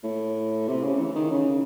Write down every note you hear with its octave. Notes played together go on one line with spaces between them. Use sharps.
A2
C3
C#3
E3
D#3
C#3